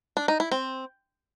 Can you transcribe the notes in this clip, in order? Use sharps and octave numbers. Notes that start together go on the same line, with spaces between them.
D4
D#4
E4
C4